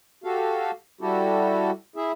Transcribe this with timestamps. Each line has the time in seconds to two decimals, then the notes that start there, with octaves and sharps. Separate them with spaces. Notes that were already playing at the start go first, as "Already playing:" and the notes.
0.24 F#4 G4 A4 F5
1.01 G3 E4 F#4 G4 A4
1.96 E4 G#4 E5